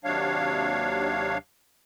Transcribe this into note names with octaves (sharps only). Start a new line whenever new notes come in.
D#2 C3 F#3 D4 C#5 F5